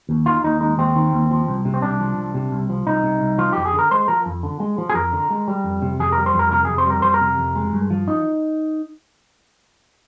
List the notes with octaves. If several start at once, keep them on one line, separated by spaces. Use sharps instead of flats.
D#2
D#3 F4
D#2 D#4
G#3 D#4
D#2 C4
D#3
D#2
F3
C2
C3
C4
C2 D4
F3
C2
C3
C2
F3
C2 D#4
C3
C2
F3 F4
F2 G4
G#4
D3
A#4
G#3 C5
F3 A#4
F2
D3
G#3
F3
G#4
F2 A#4
D3
G#3
G3
F2
C3
F2 G#4
A#4
G3
C5
F2 A#4
C3 A#4
G#4
F2
C5
G3 A#4
F2 C5
A#4
C3
F2
G#3
G2
F3
D#4